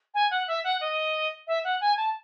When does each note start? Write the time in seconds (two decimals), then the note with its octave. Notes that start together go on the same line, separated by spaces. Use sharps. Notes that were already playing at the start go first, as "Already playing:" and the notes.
0.14 G#5
0.31 F#5
0.48 E5
0.64 F#5
0.81 D#5
1.47 E5
1.64 F#5
1.81 G#5
1.97 A5